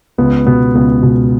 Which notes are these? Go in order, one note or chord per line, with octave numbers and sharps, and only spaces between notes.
C#2 B3
B2 B3
C#2 B3
B2